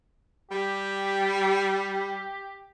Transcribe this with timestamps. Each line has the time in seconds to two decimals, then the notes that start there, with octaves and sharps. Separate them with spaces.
0.51 G3 G4